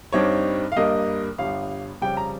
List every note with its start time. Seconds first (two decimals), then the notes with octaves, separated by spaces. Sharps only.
0.12 G2 G3 C4 D#4 C#5
0.72 F5
0.76 G2 G3 A#3 D#5
1.38 G1 G2 G3 F5
2.02 F2 C#3 G3 G5
2.17 A#5